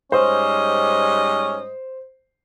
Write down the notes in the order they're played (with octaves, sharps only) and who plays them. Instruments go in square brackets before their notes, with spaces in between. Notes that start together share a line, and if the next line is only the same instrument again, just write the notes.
[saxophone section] G#2 G3 D#5 [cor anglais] C#4 [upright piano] C5